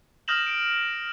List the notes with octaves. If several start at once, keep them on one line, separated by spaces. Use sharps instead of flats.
D#6 F6 G6 A#6 E7 F#7
D7